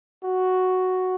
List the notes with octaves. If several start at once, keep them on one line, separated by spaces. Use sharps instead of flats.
F#4